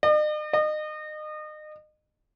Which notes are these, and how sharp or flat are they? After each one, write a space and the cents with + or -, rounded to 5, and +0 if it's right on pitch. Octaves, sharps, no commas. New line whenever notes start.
D#5 -45
D#5 -30